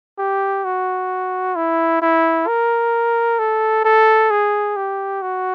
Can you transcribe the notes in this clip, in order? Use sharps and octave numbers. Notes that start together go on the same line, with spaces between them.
G4
F#4
E4
E4
A#4
A4
A4
G#4
G4
F#4